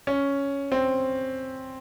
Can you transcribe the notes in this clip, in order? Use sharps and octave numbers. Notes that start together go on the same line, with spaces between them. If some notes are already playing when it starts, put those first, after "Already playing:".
C#4
C4